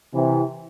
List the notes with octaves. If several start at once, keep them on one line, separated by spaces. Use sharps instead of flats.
C3 E3